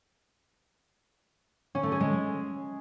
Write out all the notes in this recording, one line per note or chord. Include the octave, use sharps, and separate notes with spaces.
C#4
A3
G#4
G#3